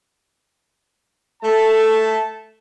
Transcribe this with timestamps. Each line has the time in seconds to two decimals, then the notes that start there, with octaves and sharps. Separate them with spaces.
1.42 A3 A5